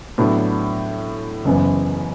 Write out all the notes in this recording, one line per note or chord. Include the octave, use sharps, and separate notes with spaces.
A2 F#3 B3 D4
F#1 F#2 C#3 E3 B3